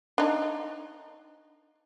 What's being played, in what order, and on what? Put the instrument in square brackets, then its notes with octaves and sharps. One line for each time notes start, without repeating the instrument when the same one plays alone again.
[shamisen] D4 D#4